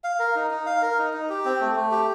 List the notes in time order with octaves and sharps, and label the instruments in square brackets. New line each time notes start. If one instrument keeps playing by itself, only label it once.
[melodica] F5
A#4
D#4
D#4
F5
A#4
D#4
D#4
G4
C4
A3
A3
G4